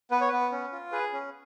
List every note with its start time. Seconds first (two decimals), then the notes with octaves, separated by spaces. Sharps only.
0.11 B3 B4
0.21 C#5
0.28 B3 B4
0.52 C#4
0.72 F4
0.92 G#4 B4
1.13 C#4